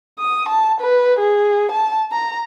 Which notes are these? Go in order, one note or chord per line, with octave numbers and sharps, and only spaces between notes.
D#6
A5
B4
G#4
A5
A#5